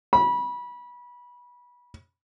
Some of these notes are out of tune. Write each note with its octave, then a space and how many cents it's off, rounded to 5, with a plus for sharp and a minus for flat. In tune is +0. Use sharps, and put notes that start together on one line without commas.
B5 -25